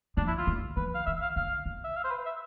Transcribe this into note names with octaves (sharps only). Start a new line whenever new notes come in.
F3 D4
E4
F4
G3
F3 B4
F5
E3 E5
F5
D3 F5
C3
E5
F5
C5
B4
E5